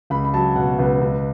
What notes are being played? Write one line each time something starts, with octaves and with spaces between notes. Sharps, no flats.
C#2 B5
B5
F#3 A5
B2 F#5
C#2 B4
C#2